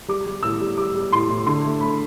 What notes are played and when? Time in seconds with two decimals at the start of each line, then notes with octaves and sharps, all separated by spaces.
0.08 G3 D6
0.27 G3
0.43 A2 E6
0.61 G3
0.78 G3 D6
0.95 G3
1.12 A2 C6
1.29 A2
1.46 D3 C6
1.64 A3
1.81 A3 B5